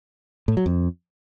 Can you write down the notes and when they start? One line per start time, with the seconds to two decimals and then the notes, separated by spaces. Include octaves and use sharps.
0.48 A2
0.57 F#3
0.66 F2